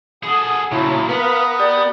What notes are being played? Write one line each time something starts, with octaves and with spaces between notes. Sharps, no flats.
G#4 A4 F#5 D#6
A#2 C#3 F#3 E4 A5
B3 A#4 B4 F5 D#6
G4 D5